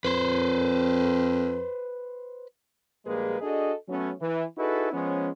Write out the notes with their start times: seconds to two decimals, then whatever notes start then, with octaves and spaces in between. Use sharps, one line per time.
0.05 F2 B4 C5
3.06 A#1 G3 G#3 A#3 G#4 B4
3.41 D4 F#4 G#4 A4 D#5
3.88 F#3 A3 B3 C#4
4.21 E3
4.57 D#4 E4 F#4 G#4 A4 B4
4.92 F3 G#3 B3 C#4